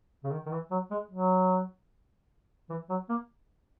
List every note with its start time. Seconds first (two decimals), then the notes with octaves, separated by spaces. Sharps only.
0.24 C#3
0.32 D#3
0.46 D#3
0.52 E3
0.71 F#3
0.91 G#3
1.11 F#3
2.69 E3
2.89 F#3
3.09 A#3